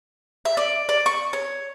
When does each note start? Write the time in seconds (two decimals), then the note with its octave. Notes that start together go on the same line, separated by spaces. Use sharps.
0.45 E5
0.57 D5
0.89 D5
1.06 C#6
1.33 C#5